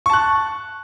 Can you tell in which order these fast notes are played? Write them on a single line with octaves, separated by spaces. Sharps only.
C#6 A5 F#6